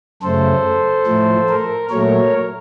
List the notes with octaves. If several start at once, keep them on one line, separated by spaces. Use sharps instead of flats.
F#2 C#3 A3 A4 C5
A2 F3 A3
A#4
A#2 F#3 A3 A#4 C#5